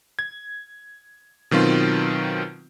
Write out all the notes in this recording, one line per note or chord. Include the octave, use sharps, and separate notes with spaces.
G#6
B2 D#3 F#3 C4 F4